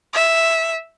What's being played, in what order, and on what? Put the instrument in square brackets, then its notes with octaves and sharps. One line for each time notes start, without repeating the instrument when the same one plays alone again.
[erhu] E5